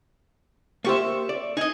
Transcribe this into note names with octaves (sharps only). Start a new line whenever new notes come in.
A#3 G4 C5 E5 C#6
D5
D#4 G#4 D#5